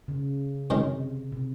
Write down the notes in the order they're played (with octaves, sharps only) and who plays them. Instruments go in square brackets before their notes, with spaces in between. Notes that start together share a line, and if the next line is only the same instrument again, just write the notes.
[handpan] C#3
[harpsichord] F#2 D#3 G#3 [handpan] C3
[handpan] C3